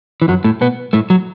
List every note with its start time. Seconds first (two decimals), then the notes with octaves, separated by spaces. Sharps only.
0.22 E3
0.28 F#2 F#3
0.44 A2 A3
0.61 B2 B3
0.93 A2 A3
1.10 F#3